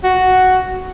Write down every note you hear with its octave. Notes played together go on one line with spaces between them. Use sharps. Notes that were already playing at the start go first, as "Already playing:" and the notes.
F#4